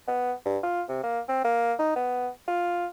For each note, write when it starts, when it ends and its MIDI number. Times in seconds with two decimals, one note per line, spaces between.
0.08 0.33 59
0.45 0.58 43
0.63 0.83 65
0.89 1.02 48
1.03 1.21 58
1.29 1.41 60
1.45 1.74 58
1.79 1.91 63
1.96 2.29 59
2.48 2.87 65